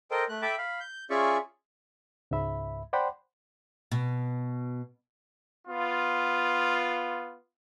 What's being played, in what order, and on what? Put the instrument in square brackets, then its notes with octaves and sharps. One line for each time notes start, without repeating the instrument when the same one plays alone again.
[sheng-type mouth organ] A4 A#4 C5 D#5 G5
A3 F#6
A4 E5 G5 A5 B5 D6
F5 B5
G6
C#4 F4 G#4 D5 E5 C#6
[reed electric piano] C#2 G#2 E5 B5
C5 D5 F#5 G5 B5 C6
[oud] B2
[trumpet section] B3 F4